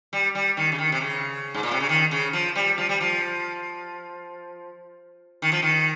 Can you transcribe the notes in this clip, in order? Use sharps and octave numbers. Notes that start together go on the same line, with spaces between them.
G3
G3
D#3
C#3
D#3
C3
C#3
G#2
A#2
C3
C#3
D#3
C#3
F3
G3
F3
G3
F3
D#3
F3
D#3